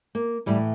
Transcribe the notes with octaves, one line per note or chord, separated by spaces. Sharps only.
A#3
A2 E3 G3